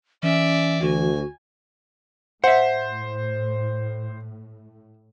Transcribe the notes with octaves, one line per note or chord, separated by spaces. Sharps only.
E3 C#4 D5 E5
D2 F#4 G#5
A2 C5 E5 F#5